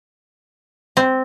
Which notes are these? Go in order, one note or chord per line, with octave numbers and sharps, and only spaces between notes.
C4